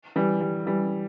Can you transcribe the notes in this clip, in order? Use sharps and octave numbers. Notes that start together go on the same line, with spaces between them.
E3 G3
G3
E3 G3